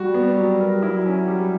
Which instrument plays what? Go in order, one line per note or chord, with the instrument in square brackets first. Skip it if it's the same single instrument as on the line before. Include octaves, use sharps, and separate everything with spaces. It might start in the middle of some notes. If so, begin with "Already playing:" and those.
Already playing: [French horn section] G3 [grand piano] F#4
[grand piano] B3
F#3
A#4
[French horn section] F#3 [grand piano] E4
[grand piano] C#4
G3